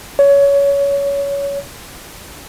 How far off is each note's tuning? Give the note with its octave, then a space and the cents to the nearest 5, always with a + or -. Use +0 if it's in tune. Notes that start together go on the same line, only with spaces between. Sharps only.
C#5 +20